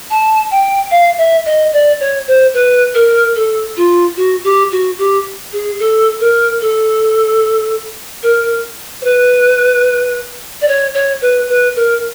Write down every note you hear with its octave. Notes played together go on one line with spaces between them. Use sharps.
A5
G5
F5
E5
D#5
D5
C#5
C5
B4
A#4
A4
F4
F#4
G4
F#4
G4
G#4
A4
A#4
A4
A#4
C5
B4
D5
C#5
C#5
B4
B4
A#4